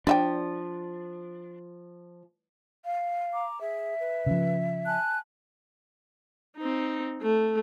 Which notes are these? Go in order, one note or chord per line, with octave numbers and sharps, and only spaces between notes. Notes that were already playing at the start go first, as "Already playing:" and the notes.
F3 D4 D5 E5 G5
F5
A#5 D6
G#4 E5
B4
C#3 F3
G#5 A5 F#6
C4 D#4
A3